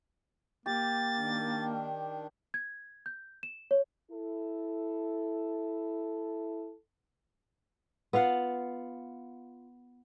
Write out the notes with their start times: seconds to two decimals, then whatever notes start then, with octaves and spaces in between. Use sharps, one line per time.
0.66 A#3 G4 A6
1.17 D#3 D4
2.54 G#6
3.06 G6
3.43 E7
3.71 C#5
4.11 E4 A4
8.13 B3 F4 F5 F#5